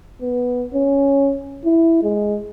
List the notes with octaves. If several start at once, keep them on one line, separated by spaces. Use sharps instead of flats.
B3
C#4
E4
G#3